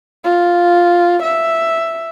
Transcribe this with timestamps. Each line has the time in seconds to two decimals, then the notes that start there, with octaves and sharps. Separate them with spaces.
0.24 F4
1.23 E5